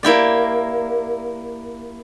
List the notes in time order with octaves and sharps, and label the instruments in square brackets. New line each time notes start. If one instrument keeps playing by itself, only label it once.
[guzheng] A#3 E4 G4 D5